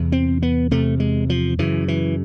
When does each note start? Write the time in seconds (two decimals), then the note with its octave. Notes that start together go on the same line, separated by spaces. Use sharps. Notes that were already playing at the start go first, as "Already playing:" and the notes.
Already playing: E2 C3
0.12 C4
0.42 B3
0.71 E2 C3 A3
1.00 G#3
1.30 F3
1.59 F#2 C#3 E3
1.88 E3